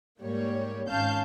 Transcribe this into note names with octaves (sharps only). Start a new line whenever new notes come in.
G#2 G3 A#3 C#5
G#1 C#4 F5 A5 G6